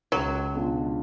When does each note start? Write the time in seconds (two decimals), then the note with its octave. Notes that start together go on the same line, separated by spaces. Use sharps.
0.12 C#2 F#3
0.55 B2 G#3 D4 F4